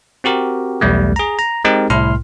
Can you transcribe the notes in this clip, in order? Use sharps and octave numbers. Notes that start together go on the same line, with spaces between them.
C4 F#4 G4 A#4
B1 E2 G3 A3
G#4 A#5
A#5
G#3 C4 D#4 G4 A#4
C2 A2 E4 C6 F6